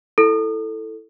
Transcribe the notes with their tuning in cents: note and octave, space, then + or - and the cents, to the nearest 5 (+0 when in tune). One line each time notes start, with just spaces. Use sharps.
E4 +0 A4 +5